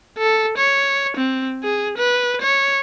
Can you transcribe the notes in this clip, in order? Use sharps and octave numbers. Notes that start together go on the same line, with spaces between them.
A4
C#5
C4
G#4
B4
C#5